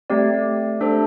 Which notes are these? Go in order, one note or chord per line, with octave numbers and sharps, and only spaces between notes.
A3 C4 G4 D5
A3 D4 A4 C5